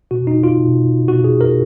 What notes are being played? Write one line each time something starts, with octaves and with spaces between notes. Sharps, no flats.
B2 F#4
D#4
F4
B2
B2 F#4
G#4
A#4